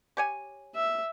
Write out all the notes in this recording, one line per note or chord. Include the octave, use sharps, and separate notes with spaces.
G4 C#5 G#5
E5